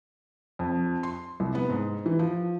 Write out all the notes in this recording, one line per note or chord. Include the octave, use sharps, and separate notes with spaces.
F2
C6
C2
B3
G#2
E3
F3